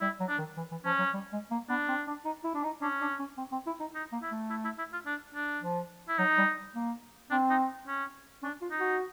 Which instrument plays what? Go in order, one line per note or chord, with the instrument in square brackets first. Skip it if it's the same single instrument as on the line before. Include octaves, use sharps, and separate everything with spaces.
[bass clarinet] G3 [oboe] E4
[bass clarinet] F#3
[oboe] D4
[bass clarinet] D#3
E3
E3
[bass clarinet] F3 [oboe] C#4
[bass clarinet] F#3
G3
G#3
A#3
[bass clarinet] B3 [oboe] D4
[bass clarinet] C4
D4
D#4
E4
D4
D#4
[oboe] C#4 [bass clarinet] D4
[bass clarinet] D4
C#4
C4
C4
E4
D#4
[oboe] D#4
[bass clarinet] A#3
[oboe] E4
[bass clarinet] A3
[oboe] E4
E4
E4
F4
D4
D4
[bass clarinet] F3
[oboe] E4
[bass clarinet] F#3 [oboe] D#4
[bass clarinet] G3
A#3
[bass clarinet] C4 [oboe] D4
[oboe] D#4
C#4
[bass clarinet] C#4 [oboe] D4
[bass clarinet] F4
[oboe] D#4
[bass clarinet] F#4